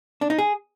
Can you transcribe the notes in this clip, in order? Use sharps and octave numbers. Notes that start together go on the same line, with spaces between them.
D4
D#4
G#4